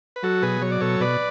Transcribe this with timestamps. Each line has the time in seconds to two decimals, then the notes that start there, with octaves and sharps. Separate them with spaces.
0.16 B4
0.23 F#3 F#4 A4
0.42 B2 G#4 B4
0.62 F#3 C#5
0.71 D5
0.80 B2 A4 C#5
1.00 B2 B4 D5